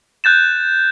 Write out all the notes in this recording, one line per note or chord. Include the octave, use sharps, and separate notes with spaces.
F#6 G6 A6 E7